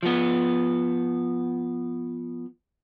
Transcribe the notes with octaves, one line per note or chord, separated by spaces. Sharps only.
F3 B3